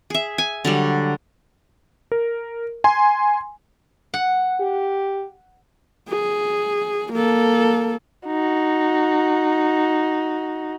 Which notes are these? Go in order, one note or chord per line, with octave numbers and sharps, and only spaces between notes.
G#4 E5
G#5
D3 F#3 G3
A#4
G#5 C6
F#5
G4
G#4
A#3 A4
D#4 F#4